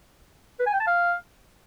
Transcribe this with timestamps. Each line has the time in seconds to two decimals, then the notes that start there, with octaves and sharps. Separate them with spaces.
0.59 B4
0.66 G#5
0.73 G5
0.80 A5
0.87 F5